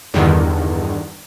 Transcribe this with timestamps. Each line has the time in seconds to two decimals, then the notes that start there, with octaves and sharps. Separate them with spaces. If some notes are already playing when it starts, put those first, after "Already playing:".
0.14 E2 G2 D3 D#3